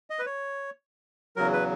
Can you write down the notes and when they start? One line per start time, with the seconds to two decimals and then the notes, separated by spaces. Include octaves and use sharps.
0.10 D#5
0.19 B4
0.26 C#5
1.36 E2 C#3 F#3 A#4
1.53 B4